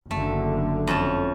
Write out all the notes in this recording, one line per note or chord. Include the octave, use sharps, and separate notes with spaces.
F#1 D3 A3
F2 C#4 A5